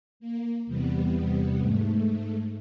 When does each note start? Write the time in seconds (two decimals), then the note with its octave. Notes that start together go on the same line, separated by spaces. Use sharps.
0.20 A#3
0.66 E2 C3 G3 B3
1.60 G#2 A3